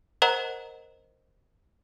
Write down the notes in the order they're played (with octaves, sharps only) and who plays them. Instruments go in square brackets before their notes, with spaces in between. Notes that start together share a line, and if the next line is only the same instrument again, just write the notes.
[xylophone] A#4 C5 D#5 F#5 A#5